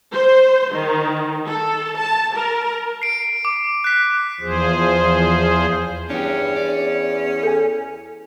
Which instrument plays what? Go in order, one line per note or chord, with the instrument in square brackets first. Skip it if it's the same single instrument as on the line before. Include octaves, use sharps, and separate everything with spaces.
[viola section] C5
D#3
A4
A5
A#4
[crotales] C7 D7
D6
F#6 B6
[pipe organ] E2 F3 G#4 C5
[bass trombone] E2 [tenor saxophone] C#4 [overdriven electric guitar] D4 G4
[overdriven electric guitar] D5
[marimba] A4 G#5